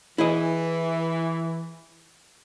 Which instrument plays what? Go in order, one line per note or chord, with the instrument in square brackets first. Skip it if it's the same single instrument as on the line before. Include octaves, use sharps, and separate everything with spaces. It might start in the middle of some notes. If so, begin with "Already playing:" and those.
[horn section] E3 [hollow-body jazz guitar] E4 G#4 D#5